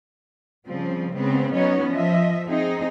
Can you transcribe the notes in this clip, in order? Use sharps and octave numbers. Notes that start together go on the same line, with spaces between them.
C#3 F3 G3 C4
C#3 G#3 B3 C4
F#3 B3 C#4 D#4 C#5
F3 D#5 E5
C4 D#4 G#4